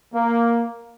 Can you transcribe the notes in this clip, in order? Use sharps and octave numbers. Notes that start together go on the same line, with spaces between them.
A#3